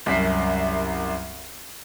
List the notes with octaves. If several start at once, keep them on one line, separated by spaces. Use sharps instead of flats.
C2 F#2 B6 C7